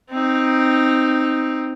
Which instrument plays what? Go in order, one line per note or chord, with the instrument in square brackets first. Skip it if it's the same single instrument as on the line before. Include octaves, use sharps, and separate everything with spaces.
[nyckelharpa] C4 D#4